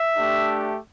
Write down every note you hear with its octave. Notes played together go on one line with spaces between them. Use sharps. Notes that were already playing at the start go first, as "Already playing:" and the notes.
Already playing: E5
A3 D4 G4